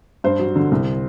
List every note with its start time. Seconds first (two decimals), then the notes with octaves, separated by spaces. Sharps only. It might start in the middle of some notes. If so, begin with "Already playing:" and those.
0.24 G2 C5
0.39 F#3
0.56 D3
0.71 C2